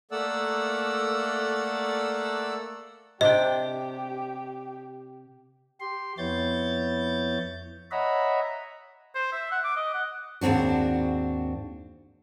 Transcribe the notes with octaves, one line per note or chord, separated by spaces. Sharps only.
A3 A#3 A4 D5 F#5 E6
C3 D4 G4 D#5 G5
G4 C6
F2 B3 E4 C#5 G6 A6
C#5 D#5 E5 F#5 A#5 B5
C5
E5
F#5
D6
D#5
F#5
D#2 G#2 C4 D4 F#4